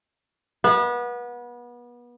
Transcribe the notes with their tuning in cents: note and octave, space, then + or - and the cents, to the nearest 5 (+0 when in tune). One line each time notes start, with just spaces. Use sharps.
B3 -30